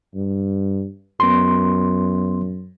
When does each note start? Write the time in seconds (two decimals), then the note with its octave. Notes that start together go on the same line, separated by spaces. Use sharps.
0.15 G2
1.20 F#2 B3 C6